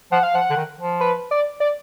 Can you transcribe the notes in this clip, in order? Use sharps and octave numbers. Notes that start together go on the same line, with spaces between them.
F3 F#5
F5
F3 F#5
D3
D#3
F3
B4
D5
D5